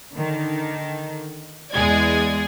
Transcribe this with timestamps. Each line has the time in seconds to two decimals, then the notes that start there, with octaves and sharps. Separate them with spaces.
0.14 D3 D#3
1.72 E2 G#3 G#4 D5 G#6